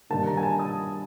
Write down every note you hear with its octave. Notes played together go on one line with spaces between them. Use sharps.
G2 D#3 G3 A#3 D4 A5
A#5
G#5
A5
D#6